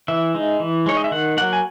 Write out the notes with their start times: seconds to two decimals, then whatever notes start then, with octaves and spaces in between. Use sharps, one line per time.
0.08 E3 E5
0.34 G#3 D#4
0.60 E3
0.86 G#3 D#4 C#5
0.97 D#5
1.04 E5
1.11 D#3 F#5
1.37 F#3 A#3 F#5
1.53 G#5